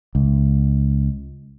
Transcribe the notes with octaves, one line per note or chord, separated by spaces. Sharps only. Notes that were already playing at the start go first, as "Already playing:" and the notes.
C#2